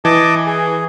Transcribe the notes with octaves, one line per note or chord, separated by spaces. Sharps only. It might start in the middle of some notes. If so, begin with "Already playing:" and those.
E3 D#5 A5 D6
G#4